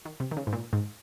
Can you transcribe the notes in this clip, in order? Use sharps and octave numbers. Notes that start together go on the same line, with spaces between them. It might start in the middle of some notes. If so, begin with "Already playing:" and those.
D#3
C3
D#3
C#3
G#2
A#2
G#2